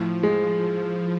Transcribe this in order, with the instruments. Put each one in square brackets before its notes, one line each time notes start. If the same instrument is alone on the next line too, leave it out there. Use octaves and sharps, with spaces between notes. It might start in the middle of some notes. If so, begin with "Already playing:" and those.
Already playing: [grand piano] A2 [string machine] F3
[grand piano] G#3